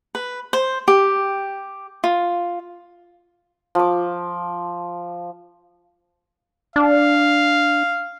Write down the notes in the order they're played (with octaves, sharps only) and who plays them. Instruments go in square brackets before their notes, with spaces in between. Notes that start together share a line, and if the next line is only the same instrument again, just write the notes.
[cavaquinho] B4
C5
G4
F4
[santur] F3 D6
[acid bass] D4 [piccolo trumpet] F5